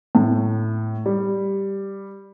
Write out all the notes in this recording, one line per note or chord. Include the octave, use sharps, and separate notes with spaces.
A2
G3